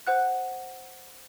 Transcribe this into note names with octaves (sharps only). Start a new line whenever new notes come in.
C5 F#5 F#6